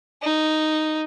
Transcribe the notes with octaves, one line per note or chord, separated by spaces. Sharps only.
D#4